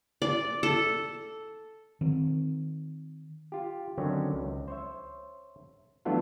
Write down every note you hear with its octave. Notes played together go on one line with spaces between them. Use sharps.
D5
A4
D#3 C4
F4 G4
D3 D#3 F#3 C4 C#4
C#2
C5 C#5 E5
E3 F#3 A3 B3 D4 F4